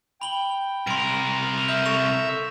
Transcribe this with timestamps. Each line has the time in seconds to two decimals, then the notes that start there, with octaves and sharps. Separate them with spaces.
0.21 G5 B5 F#7 G7
0.87 C2 A#4 C6 D7
1.68 E5 G6
1.86 A4 C#6 A#6 F7